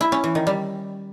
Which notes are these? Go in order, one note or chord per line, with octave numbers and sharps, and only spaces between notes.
E4
C#4
E3
D#3
G3